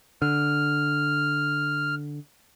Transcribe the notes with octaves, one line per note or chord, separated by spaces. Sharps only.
D3 F6